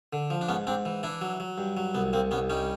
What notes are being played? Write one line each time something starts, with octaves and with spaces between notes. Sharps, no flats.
D3
F3
D4
G#2 B3 C#4
G#2 C4 D4
E3
E3 D4 E4
F#3
F#3
G2
F#3
C2 B3
C2 A#3 C4
C2 B3 C#4
G3 C#4 D#4